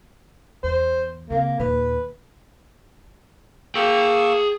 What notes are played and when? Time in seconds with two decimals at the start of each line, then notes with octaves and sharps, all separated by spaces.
0.63 E2 C5
1.30 C#3 A#3 C4
1.60 D#2 A#2 B4
3.75 A#3 G#4 G5 C#6 E6